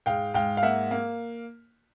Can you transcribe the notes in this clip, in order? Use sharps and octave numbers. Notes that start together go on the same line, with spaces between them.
G#2 F5 G5
G#2 F5 G5
F5
A#3 E5 F#5
A#3